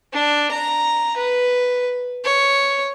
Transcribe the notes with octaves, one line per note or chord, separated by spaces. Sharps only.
D4
A#5
B4
C#5